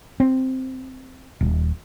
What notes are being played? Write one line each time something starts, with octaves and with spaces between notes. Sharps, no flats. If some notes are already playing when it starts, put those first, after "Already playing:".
C4
D#1